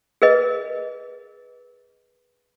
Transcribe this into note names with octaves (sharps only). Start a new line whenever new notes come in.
G#4 A#4 B4 D#5